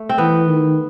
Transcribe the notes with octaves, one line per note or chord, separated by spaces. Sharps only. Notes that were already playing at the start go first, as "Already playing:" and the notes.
Already playing: A3
C4
E3 B3
D#3